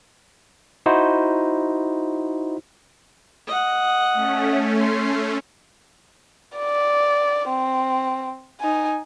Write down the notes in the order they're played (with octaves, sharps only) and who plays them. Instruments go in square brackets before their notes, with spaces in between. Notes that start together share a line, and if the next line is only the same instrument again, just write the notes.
[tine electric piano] D#4 E4 F#4 C5
[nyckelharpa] D#5 F#5
[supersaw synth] A3 C#4
[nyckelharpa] C6
[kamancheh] D5
C4
D#4 G#5